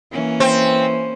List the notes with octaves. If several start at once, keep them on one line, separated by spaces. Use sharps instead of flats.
E3 A#3 C#4
C4